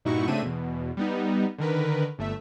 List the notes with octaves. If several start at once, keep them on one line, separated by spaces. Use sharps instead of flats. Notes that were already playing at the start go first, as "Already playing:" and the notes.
G2 A#2 D#4 E4 F#4 C#6
C#3 A3 C4 D4 E5 D#7
E2 B2
G3 B3 D#4
D3 D#3 A#4 B4
G1 A3 E5